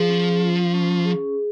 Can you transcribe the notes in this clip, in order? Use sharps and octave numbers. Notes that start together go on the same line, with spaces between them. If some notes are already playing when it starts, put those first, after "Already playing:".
Already playing: F3 G#4
C#4
F4
C#4
G#4